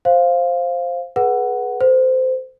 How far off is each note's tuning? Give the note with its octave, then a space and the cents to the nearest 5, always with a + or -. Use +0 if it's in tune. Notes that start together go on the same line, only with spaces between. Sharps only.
C5 +5 F5 +0
G#4 +20 B4 -20 F#5 +5
A4 +25 C5 -20